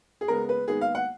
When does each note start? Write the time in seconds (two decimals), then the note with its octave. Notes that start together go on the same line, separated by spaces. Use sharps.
0.21 G#4
0.28 C#3 G#3 B3 A#4
0.49 B4
0.68 D#3 G#3 B3 G#4
0.81 F5
0.95 F#5